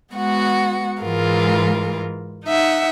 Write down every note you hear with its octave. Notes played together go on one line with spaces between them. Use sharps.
G#3 B3 F#4 F#5
G#2 E3 G#3 F4 A#4
D#4 E5 F#5